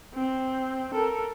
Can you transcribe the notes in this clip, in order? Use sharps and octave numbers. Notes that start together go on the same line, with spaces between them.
C4
A4 A#4